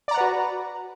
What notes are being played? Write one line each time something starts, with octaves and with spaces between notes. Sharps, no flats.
F#4 B4 D5 F#5 A#5